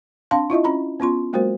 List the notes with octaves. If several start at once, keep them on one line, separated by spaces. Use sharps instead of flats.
C4 D4 F5 A5 C6
E4 F4 D#5 E5
C#4 A#5 B5
B3 C#4 F4 C6
F#3 G#3 A#3 F#4 A#4 C5